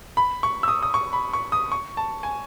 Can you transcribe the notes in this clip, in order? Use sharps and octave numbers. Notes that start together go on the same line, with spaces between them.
B5
C#6
E6
D#6
D#6
C#6
B5
C#6
D#6
C#6
A5
G#5